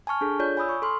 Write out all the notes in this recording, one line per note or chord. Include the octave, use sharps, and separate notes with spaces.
G#5 A5 C#6 F6
D4 G#4 A4
F4 C#5 D5 G6
G#5 B5 D#6 E6
C#6
A4 C6 F6